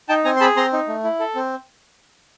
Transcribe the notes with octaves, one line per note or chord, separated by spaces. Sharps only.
D#4 G5 A5
C4 G#5 A#5
C6
G#4 A5 B5
C4 A#5 C6
D#4
A3
E4
A4
C4